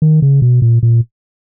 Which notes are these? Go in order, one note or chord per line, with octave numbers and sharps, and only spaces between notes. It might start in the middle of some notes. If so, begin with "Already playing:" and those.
D#3
C#3
B2
A#2
A#2